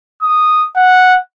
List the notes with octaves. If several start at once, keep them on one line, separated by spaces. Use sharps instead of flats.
D#6
F#5